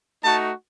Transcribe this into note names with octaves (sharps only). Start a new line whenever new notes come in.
A3 D#4 F#4 A5